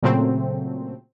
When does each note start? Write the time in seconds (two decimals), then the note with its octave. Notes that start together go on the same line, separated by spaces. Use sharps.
0.03 A#2 C#3 F#3 A3 C4